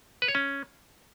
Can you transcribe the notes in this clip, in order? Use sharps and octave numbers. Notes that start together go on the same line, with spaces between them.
B4
C#5
C#4